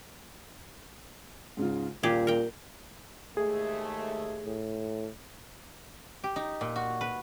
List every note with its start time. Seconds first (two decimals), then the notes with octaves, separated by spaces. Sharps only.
1.57 G#2 C#3 F4
2.03 D#1 A#2 G4 G#4 D5 F5
2.27 A#4 G5
3.37 D#2 G#3 A3 G#4
4.45 A2
6.24 G4
6.36 D#4
6.61 A#2
6.76 F#4
7.01 B4